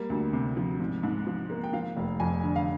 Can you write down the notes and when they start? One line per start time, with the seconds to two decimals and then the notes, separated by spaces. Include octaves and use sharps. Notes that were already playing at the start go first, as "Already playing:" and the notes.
Already playing: G3 A#3
0.10 D2
0.33 C3
0.57 F3
0.80 G#2
1.03 G#2
1.27 F3
1.50 A#3
1.64 G5
1.73 F3 F5
1.97 F1
2.20 F2 G#5
2.44 D3
2.56 F5